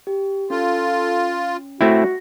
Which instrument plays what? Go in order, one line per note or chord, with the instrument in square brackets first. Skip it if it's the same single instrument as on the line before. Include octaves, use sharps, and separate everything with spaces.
[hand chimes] G4
[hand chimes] C#4 [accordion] F4 [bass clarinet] A4
[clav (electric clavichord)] A3 C4 E4 [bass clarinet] F#4 [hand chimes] A#6